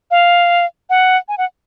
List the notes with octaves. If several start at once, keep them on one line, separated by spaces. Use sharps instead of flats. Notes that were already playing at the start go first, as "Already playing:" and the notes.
F5
F#5
G#5
F#5